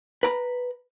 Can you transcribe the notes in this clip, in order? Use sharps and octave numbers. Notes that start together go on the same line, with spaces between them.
B4 A#5 B5